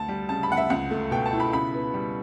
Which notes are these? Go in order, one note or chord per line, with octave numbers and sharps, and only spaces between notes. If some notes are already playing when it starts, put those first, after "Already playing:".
Already playing: D2 A5
G3
C#3 A5
B5
D2 F#5
E5
C#2 F#5
A3
B2 G5
A5
E4
B5
C#3 B5
B3
G3